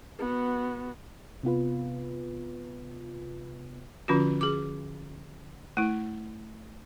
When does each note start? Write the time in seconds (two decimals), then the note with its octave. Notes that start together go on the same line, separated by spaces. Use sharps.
0.19 B3 F#4
1.43 C3 B3 F4 B4
4.08 D3 F3 C#4 F4 F#4
4.41 G#4 D6
5.77 A3 E4